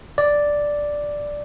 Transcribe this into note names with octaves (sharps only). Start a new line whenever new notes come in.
D5